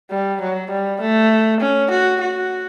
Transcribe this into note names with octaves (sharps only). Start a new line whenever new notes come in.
G3
F#3
G3
A3
C#4
F#4
F#4